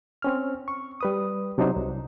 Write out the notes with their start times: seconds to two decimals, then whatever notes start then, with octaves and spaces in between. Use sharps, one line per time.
0.22 C4 C#4 F6
0.68 C#6
1.01 G3 B4 D#6
1.58 C3 F#3 D4 D#4 C5
1.76 C2